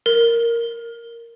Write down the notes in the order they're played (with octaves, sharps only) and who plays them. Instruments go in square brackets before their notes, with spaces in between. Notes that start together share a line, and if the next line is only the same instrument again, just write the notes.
[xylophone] A#4